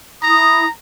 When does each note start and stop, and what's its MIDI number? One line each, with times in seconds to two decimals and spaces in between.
0.23 0.63 64
0.23 0.70 82
0.23 0.63 87